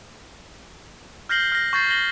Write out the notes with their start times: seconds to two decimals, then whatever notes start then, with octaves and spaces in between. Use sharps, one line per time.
1.29 F6 G6 A#6 C7 F#7 G7
1.52 F6 A#6
1.73 C#6 G6 A6 C7
1.90 A#6 F#7 G7